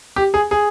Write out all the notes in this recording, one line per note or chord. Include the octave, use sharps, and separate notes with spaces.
G4
G#4
G#4